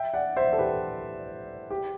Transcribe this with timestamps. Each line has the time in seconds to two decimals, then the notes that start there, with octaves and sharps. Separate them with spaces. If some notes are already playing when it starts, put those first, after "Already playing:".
Already playing: E5 G5
0.14 D5 F#5
0.37 C5 E5
0.53 A4
0.58 G4 B4
1.71 G4